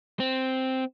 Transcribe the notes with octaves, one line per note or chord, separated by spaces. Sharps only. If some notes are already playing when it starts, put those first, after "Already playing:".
C4